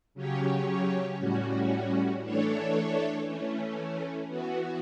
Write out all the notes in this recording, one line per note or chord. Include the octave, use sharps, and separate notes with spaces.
C#3 F#3 C#4 G4 C#5
A2 G3 C#4 F#4
E3 A3 D4 A4 C#5
E3 A3 C#4
E3 B3 F#4